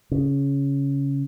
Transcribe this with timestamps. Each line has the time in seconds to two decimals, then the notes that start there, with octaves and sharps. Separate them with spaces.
0.12 C#3